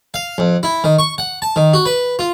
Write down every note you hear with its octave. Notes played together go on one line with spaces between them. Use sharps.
F5
F2
E4
D#3
C#6
F#5
A5
D#3
F#4
B4
F4